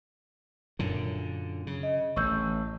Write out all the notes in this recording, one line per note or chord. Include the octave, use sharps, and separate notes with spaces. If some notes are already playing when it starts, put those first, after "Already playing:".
F#2 A#2 D3
C#3
D#5
A1 C#6 E6 G6